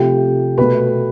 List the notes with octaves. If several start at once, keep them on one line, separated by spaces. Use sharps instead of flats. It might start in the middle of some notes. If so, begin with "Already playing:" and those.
Already playing: C3 F3 A3 G4 G5
B2 A3 B4 B5